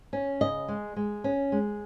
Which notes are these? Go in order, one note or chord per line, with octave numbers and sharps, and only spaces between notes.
C#4
C#3 D#5
G#3
G#3
C#4
G#3